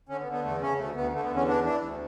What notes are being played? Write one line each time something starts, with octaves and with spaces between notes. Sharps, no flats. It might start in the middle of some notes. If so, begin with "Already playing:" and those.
D3 C#4
B3
D3
B3
E2 A3
C#3 C#4
D2 A3
D2 B3
D3 A3
B3
E2
C#4
E3 D4
E3 D4
D2